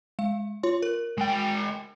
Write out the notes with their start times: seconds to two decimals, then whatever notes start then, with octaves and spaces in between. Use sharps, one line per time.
0.19 G#3 F5
0.63 F4 C#5 C6
0.82 A#4
1.18 G#3 G5